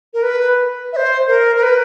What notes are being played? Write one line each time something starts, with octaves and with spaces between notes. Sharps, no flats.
A#4
B4
E5
C5
A#4
A#4
B4